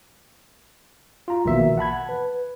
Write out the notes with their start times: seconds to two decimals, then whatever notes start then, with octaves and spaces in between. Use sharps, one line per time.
1.28 F4 A#5
1.45 A#1 B2 D#3 E3 A#3 E5
1.78 F#5 A5 B5 G#6
2.09 B4